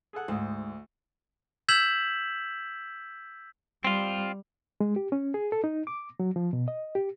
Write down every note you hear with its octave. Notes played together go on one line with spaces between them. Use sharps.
G#4 A4 F#5
D2 G#2
E6 G6 G#6 B6 E7 F#7
G3 C4 F4
G#3
G4
C#4
G#4
A4
D#4
D6
F#3
F3
B2
D#5
G4